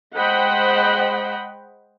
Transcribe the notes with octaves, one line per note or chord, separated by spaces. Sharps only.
G#3 C5 D#5 F#5 G5 B5